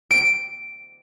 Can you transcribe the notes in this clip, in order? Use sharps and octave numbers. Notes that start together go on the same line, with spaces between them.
D7